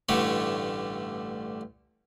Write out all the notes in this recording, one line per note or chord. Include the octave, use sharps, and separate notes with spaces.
A1 G2 D3 A3 C#5